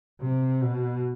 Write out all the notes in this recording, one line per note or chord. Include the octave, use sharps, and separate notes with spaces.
C3
B2